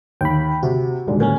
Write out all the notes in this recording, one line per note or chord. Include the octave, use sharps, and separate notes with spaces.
D#2 G5 B5
C3 F#4
D#1 G#2 D3
A2 A#3 C#4 A#4